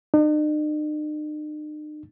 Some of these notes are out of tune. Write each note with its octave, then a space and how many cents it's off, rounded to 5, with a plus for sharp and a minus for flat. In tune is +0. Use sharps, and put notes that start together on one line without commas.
D#4 -45